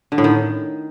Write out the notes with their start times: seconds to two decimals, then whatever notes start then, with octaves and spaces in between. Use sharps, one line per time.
0.12 D3
0.18 A2
0.24 D#3